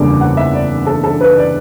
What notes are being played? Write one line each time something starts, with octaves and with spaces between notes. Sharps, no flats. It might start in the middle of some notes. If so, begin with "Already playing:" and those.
Already playing: F#1 E2 D3 G3 D4 D6
F#5
E5
D5
A4
A4
B4
D5